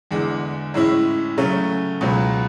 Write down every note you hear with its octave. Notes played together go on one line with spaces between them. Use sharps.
E2 D3 G#3
A2 G#3 C#4 E4
C#3 F#3 A3 C#4
C#2 B2 F#3